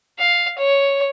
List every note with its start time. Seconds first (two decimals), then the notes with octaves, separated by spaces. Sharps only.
0.19 F5
0.58 C#5